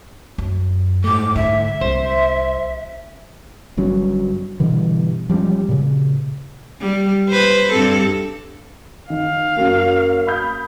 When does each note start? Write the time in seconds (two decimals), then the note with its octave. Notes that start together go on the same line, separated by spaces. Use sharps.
0.38 F#2
1.04 G#2 A3 D6
1.36 D3 E5
1.81 C2 C5
3.77 G1 G2 F#3 C#4
4.60 G2 B2 D3 E3
5.29 F3 G3 G#3 C#4
5.69 A#2 C#3
6.81 G3
7.29 B4 C5
7.72 G2 C4 A4
9.10 D#3 F5
9.57 F#2 A#3 F#4
10.27 B5 D#6 G6